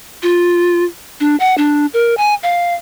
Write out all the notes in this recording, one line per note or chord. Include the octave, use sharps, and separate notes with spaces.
F4
D4
F#5
D4
A#4
G#5
F5